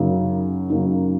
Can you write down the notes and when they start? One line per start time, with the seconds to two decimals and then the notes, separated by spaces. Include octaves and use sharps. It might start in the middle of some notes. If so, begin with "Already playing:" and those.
Already playing: F#2 C#3 A#3 D#4
0.70 F#2 C#3 A#3 D#4